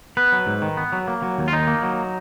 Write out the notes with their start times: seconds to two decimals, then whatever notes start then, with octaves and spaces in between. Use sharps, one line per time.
0.17 B3 B4
0.32 F#3
0.47 G#2
0.62 D#3
0.77 B3
0.92 F#3
1.07 A#3
1.22 F#3
1.38 D#2
1.48 F4
1.52 D#3 D#4
1.67 A#3
1.83 F#3